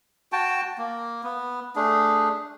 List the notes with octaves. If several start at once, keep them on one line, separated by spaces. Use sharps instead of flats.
F#4 G5 A5
A#3
B3
A3 D4 G#4